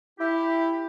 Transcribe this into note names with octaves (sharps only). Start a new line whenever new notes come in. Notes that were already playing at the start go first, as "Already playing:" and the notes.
E4 G4